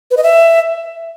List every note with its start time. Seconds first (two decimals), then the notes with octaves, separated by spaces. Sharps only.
0.11 B4
0.17 D#5
0.23 E5